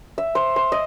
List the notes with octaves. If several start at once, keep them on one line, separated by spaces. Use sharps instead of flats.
E5
C5
C5
D#5